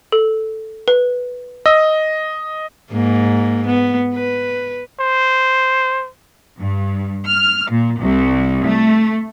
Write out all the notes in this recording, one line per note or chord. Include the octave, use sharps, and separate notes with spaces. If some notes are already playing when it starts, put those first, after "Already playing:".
A4
B4
D#5 E6
G#2 A#3
B3
B4
C5
G2
F6
A#2
C2
A3